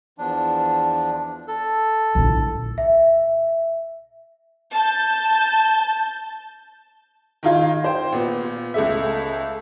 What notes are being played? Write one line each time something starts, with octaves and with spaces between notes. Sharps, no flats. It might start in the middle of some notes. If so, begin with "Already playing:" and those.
E2 F3 D4
A4
A#1 E4
E5
A5 G6
D#3 D#4 F4 G#6
C5 G5
A#2 B3
C#2 A3 E5